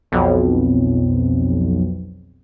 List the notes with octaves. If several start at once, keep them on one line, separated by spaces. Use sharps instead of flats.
B1 F2